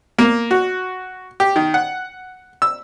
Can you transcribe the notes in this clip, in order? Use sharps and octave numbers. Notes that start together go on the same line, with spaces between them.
A#3
F#4
G4
D#3
F#5
E6